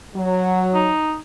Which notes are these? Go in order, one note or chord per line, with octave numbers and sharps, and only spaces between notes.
F#3
D#4